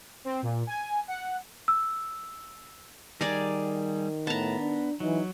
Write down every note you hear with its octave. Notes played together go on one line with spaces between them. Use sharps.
C4
A#2
G#5
F#5
E6
D#3 G3 G#4 D5 G#5 A#5
A2 B3 A5 A#5
D4
E3 F#3 D#4